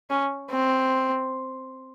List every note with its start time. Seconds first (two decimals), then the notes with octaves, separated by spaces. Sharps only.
0.10 C#4
0.51 C4